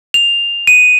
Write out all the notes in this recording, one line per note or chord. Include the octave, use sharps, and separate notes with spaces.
F7
D#7